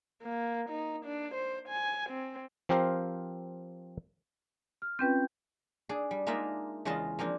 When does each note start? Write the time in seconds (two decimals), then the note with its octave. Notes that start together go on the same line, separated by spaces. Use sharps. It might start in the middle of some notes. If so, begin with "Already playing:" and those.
0.22 A#3
0.70 D#4
1.05 D4
1.35 C5
1.68 G#5
2.10 C4
2.69 F3 C4 G4 A#4 C5 F5
4.82 F6
4.99 C4 C#4 F4 B4 G5 G6
5.89 D4 G#4
6.11 G3
6.27 G#3 A#3 D4 D#4 F4 E5
6.85 E2 C#3 G#3 F4 D#5 A5
7.19 F3 A#3 C4 D4